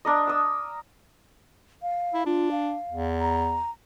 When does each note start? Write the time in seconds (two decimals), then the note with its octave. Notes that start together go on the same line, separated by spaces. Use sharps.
0.05 D4 A#4 D#5
0.27 D#6 E6
1.82 F5
2.14 E4
2.26 D4 F4
2.51 F5
2.91 E2
3.21 A#5